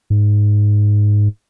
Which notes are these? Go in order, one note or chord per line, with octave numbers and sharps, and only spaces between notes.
G#2